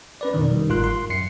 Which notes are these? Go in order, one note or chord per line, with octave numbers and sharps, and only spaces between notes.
C#4 B4 D5
F2 B2 D#3
D#3 G3
G1 G#2 F4 A#4 C6 F#6
C6
F#2 C7 C#7